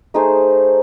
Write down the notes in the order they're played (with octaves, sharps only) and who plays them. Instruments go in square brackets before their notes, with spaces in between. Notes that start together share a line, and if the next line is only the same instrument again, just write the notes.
[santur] A3 D#4 G#4 C5